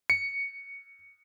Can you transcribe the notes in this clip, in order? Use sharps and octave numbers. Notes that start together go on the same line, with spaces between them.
C#7